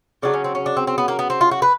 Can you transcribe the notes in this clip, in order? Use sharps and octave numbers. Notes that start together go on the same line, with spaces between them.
C#3 F#3 A3 D4
C#4
C4
C#4
D4
C4
C4
B3
A#3
B3
C4
F4
F#4
B4